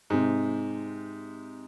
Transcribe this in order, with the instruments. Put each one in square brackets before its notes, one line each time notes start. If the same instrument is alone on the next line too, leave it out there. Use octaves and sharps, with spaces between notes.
[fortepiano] G#2 C3